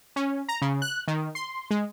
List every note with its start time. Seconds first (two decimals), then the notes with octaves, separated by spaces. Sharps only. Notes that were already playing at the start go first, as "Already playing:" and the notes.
0.16 C#4
0.49 A#5
0.62 C#3
0.82 F#6
1.08 D#3
1.35 C6
1.70 G#3